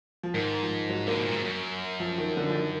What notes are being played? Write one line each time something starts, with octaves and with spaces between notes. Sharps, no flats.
F3
G#2 D#3
F3
F#3
D3 A#3
B2
A#2
G#2
F#2
F3
D#3
D3
F3
D#3